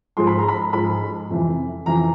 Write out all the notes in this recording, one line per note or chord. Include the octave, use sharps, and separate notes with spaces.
G#2 F3 G#3 C6
B5
A#5
B5
G#2 F3 G#3 B5
F2 C3 E3
F2 C3 E3 A#5